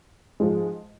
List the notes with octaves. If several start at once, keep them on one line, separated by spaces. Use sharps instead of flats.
G#2 F3 G#3